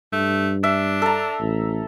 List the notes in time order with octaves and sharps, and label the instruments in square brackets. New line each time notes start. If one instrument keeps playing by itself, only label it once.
[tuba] G2 [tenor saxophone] A3
[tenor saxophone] D4 [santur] E5
[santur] A4 A#5
[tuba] A1